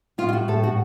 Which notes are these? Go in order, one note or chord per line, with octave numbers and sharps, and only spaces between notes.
A2 F4
F4
A2 F#4
A2 A4
A2 F#4